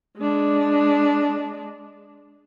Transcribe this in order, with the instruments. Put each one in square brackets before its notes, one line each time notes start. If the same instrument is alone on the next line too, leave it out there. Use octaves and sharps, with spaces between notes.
[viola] G#3 D4